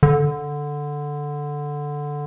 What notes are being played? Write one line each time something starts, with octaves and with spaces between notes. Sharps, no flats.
D3